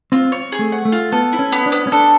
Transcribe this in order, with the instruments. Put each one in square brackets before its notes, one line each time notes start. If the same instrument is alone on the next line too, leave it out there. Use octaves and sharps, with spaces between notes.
[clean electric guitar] C4 [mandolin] F4
[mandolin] C#5
G#4
[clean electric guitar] A3
[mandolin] F#5
[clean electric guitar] A3
[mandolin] F4
[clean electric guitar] B3 [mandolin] A4
[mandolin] E4
[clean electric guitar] C#4
[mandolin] B3
[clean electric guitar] D4
[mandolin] B3
[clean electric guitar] C#4
[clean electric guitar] D4 [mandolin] A4